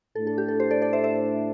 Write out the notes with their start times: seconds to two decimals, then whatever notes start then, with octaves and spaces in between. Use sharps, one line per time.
0.15 A2 A3 D4 A4
0.27 A4
0.38 G4
0.48 A4
0.60 G4 C5
0.71 A4 D5
0.82 A4 D5
0.93 C5 E5
1.04 C5 E5